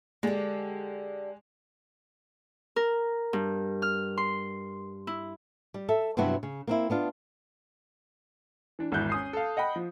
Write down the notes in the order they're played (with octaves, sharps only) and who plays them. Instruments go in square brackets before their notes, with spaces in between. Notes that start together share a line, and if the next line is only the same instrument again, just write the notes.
[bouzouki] D3 G4 [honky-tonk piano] G#3
[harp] A#4
G2
F6
C6
E4
[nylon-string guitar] G3
A4 E5
G2 C3 F#3 B3 E4 F#4
C#3
A#3 C4 E4
B3 D4 F4
[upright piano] E3 D4
G#1 E2 E4 F#6 G6
C#4 D#6 C7
A4 F5
D#5 F#5 G5 B5
F3